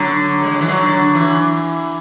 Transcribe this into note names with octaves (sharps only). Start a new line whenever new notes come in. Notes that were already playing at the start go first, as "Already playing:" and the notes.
Already playing: D3 F#3
G#3
F#3
E3
D3 F#3
E3